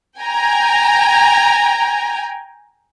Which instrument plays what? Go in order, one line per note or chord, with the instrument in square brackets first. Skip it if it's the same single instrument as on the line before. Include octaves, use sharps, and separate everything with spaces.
[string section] G5 G#5 A#5